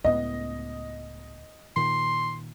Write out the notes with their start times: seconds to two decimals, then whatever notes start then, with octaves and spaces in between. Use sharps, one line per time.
0.04 C#2 A2 B3 D#5
1.76 A#2 D#3 C6